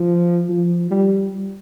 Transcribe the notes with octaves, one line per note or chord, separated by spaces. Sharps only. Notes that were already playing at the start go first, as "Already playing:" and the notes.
Already playing: F3
F3
G3